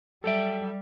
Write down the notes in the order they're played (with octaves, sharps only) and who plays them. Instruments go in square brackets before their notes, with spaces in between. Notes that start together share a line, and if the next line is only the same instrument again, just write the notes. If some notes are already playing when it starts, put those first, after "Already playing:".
[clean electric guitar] F#3 G4 G5 [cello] G3 [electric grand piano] A4 E5